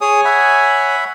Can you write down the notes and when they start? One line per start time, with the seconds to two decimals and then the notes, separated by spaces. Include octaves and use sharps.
0.01 G#4 C#5 G#5 D#6
0.25 E5 F#5 B5